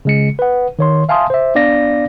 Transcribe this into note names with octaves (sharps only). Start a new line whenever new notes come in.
C#3 G#3 C#7
B4 F#5
D#3 C#5 C6
E5 F5 G#5 A5 C6 D#6
C5 E5
B3 D4 D5 F5 A#6